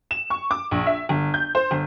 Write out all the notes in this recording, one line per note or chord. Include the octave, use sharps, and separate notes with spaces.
E7
C#6
D6
A#1
E5
G1
G6
C5
G1